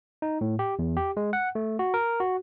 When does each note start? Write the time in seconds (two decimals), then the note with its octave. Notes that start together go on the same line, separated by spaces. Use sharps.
0.22 D#4
0.41 A2
0.59 G4
0.79 E2
0.97 G4
1.17 G#3
1.33 F#5
1.55 A3
1.79 F#4
1.94 A#4
2.20 F#4